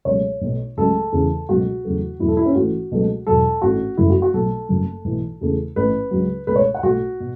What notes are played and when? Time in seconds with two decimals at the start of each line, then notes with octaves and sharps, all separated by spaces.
0.05 C#2 B2 F#3 A3 C#5
0.41 B1 B2 A3
0.77 C#2 C#3 F#3 A3 A4
1.12 E2 C#3 E3 A3
1.49 C#2 B2 F#3 A3 F#4
1.85 E2 C#3 F#3 A3
2.19 E2 B2 F#3 A3 E4
2.28 A4
2.37 E4
2.46 C#4
2.55 A1 A2 E3 A3 F#4
2.91 C#2 B2 F#3 A3
3.27 E1 E2 B2 F#3 A4
3.62 A1 A2 A3 F#4
3.97 F#1 F#2 F#3 A3 E4
4.10 F#4
4.22 F#4
4.33 B1 B2 F#3 A3 A4
4.69 F#1 F#2 F#3 A3
5.04 B1 A2 E3
5.41 E2 C#3 A3
5.76 A1 A2 A3 B4
6.11 C#2 C#3 F#3
6.47 C#2 B2 A3 B4
6.56 C#5
6.74 F#5
6.83 B1 A2 A3 F#4
7.20 B2